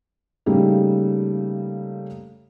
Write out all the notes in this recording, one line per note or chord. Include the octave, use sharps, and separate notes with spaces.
C#3 G3 A3 A#3 D#4